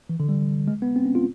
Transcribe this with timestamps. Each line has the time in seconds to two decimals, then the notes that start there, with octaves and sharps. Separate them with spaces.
0.09 E3
0.20 D3
0.29 G3
0.68 G#3
0.82 B3
0.96 C4
1.05 C#4
1.15 F4